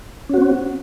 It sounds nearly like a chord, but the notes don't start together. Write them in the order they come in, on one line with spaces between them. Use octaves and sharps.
C#4 F#4 C4